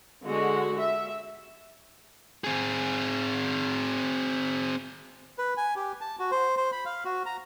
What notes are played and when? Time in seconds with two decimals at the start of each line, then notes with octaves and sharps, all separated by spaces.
0.25 D3 G#3 F#4
0.79 E5
2.44 C4 G#4
5.38 B4
5.57 G#5
5.76 G4
6.01 A5
6.19 F#4
6.31 C5
6.57 C5
6.72 B5
6.85 F5
7.05 F#4
7.26 A#5